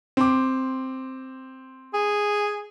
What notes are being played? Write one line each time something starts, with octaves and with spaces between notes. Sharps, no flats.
C4 D6
G#4